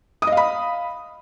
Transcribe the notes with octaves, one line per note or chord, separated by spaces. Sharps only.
D#5 F5 B5 D#6